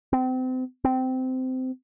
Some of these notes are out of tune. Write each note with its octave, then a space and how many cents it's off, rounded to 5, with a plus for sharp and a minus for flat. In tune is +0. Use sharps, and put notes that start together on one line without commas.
C4 -35
C4 -20